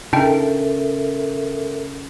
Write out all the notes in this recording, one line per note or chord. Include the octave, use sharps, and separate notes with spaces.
C#3 D4 D#4 A4 A#4 E5 G5